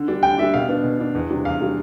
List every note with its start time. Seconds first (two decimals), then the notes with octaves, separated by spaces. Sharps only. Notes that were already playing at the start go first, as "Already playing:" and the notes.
Already playing: D3
0.08 G3 D4
0.23 D3 G5
0.38 G3 D4 E5
0.54 B2 F5
0.69 B3 D4
0.84 B2
0.99 B3 D4
1.15 E2
1.30 C3 G3 D4
1.45 E2 F5
1.61 C3 G3 D4